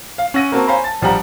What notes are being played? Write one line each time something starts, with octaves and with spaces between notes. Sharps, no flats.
F5
C#4 F#5 E6 A#6 D#7
A#3 C4 F#4 A#4 A5
C5 C#5 F5 G#5 A#5 B5
A5 A6
A#1 F3 G3 G4 F#5 A#5